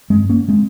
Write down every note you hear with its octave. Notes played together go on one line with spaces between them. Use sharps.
G2 G#3 C4
A#3 C#4
G#3 C4